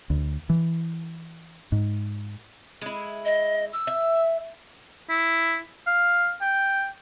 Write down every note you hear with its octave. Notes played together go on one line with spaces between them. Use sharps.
D2
E3
G#2
G#3 E4
D#5
E6
E5
E4
F5
G5